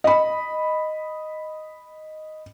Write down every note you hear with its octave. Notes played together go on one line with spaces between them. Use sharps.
D#5 B5